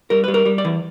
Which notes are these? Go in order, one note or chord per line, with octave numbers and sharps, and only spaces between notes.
G3 A#4
G3 B4
A#4
G3
D5
E3